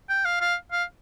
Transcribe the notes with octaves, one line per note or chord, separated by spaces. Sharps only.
G5
F5
F5
F5